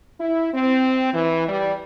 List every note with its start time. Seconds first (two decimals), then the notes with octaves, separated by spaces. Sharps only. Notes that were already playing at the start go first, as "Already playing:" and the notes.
0.20 E4
0.54 C4
1.14 E3
1.49 G3